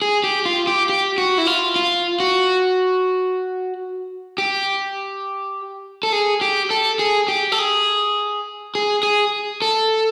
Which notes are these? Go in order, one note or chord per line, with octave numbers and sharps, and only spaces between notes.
G#4
G4
F4
G4
G4
F#4
E4
F4
F4
F#4
G4
A4
G#4
G4
A4
G#4
G4
A4
G#4
G#4
G#4
A4